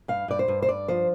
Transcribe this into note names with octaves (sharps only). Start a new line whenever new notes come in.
G2 F5
G2 D5
C5
G2
C5
G2 D5
F3 C5